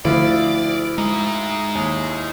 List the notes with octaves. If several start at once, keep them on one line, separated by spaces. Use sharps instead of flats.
D2 D3 F3 E4 F4 D5
G#3 D#4 G#4
D#2